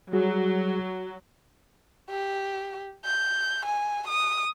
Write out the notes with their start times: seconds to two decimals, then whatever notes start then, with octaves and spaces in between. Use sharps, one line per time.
0.13 F#3 G3 F#4 G#4
2.10 G4
3.05 G6
3.65 G#5
4.08 D#6